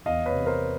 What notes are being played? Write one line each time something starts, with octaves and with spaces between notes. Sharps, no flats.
E2 D#5 F5
B4 C#5
C3
A#4 C5